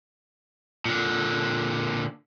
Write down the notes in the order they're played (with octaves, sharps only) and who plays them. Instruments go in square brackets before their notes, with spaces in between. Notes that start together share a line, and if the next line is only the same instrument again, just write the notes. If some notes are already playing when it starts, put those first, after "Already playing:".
[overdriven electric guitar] A#2 D3